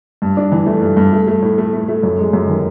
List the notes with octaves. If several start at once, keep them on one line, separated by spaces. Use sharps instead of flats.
G2
D4
E3
A3
G2
G2
A3
A3
A2
A3
A3
A3
F#2
G#3
F#2
D#3